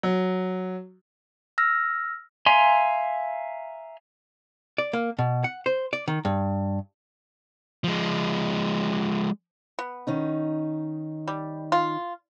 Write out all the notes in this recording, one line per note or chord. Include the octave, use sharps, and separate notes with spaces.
F#3
E6 F6 A#6
E5 F5 G#5 A#5 C6
D5
A#3
B2
F#5
C5
D5
D#3
G2
F3 G#3
B3
D#3 C#4 D#4
G3
F4